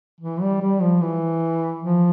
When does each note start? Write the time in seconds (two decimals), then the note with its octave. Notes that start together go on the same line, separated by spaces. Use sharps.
0.20 E3
0.41 G3
0.62 G3
0.81 F3
1.01 E3
1.83 F3